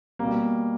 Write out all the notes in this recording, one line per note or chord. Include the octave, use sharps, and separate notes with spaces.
B2 G3 A#3